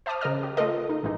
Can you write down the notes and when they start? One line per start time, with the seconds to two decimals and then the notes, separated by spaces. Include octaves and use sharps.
0.06 C5 E5 A5 D6 D#6 F6
0.21 C#3 A#4 C5 D#5 F6
0.43 G4
0.57 A3 F4 A4 A#4 D#5
0.89 D#4
1.03 A1 G#2 E3 D#4